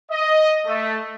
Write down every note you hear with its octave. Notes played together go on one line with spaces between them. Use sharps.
D#5
A3